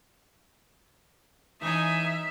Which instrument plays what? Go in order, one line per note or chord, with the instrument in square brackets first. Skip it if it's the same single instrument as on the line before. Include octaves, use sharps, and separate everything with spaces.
[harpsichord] E3 C#4 [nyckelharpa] D#4 G#5 [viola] E5